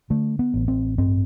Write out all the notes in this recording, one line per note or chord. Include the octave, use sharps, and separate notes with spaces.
D3 A3
B3
A1
C4
G2 C4